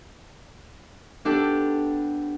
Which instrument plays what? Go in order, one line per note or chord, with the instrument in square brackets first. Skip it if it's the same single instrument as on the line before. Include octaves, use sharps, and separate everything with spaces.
[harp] B3 D4 G4 A4